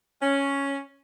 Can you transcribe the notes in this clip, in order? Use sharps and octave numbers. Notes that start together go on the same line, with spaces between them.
C#4